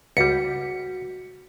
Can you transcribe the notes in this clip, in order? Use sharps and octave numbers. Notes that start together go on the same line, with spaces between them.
C#2 G3 F#4 F#5 B6 C#7